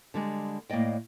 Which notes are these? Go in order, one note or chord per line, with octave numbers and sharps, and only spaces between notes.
D3 G3 G#3
A2 A#3 D5 D#5 G5